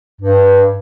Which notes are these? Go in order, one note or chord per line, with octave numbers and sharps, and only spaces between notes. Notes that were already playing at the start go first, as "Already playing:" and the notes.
G2